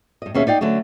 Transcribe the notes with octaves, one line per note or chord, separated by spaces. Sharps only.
G2 D#5
D#2 B2 C#4 G#4 E5 F5
D#4 D5 F5 G5
D3 F#3 A3 C#4